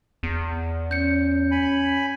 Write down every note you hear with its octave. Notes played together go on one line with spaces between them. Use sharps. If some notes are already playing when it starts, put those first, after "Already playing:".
E2
C#4 G6 C#7
G#5 B5